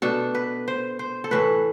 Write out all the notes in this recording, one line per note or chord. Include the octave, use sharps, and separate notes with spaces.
B2 A3 D4 A4
B4
C5
C5
A4
A2 E3 A3 B4